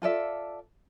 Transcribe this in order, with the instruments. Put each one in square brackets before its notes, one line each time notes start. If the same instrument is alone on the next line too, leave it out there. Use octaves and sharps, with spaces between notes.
[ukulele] F4 A4 D5 E5